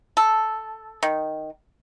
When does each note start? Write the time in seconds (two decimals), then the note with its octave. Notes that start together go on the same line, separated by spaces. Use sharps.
0.17 A4
1.03 D#3